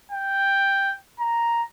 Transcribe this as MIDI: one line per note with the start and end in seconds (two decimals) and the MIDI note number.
0.12 0.94 79
1.20 1.62 82